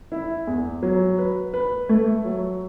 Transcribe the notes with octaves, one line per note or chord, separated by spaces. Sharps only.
E4
E2
F#3
B4
B4
A3
F#3